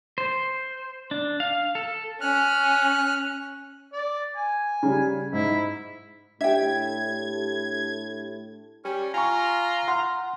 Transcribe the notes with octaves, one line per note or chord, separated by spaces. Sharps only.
C5
D4
F5
A4
C#4 F6 F#6
D5
G#5
C#3 G3
G#2 E4
A2 D4 G4 E5 G5 G#6
G3 C#4
F4 G#5 A#5 C#6
F#5 C6 F6